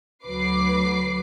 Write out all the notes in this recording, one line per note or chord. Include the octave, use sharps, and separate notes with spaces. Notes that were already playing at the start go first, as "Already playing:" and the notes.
D2 F#3 B4 D6 C7